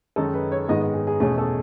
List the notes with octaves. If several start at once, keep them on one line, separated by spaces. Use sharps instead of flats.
F#2 D#3 G#3 D#4 A4
B4
C#5
G#2 D#3 G#3 B3 D#5
D#5
G#4
G#4
E2 B2 A3 C#4 G#4
A4